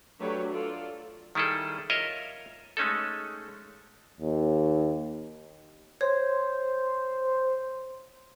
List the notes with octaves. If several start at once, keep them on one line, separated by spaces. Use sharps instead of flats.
F#3 A3 D4 G4 B4 C#5
F4 A4 D5
D#3 G3 E4 G#4 A4
F4 A#4 C#5 D#5 E5
G#3 A3 C#4 D#4 A4
D#2
C5 C#5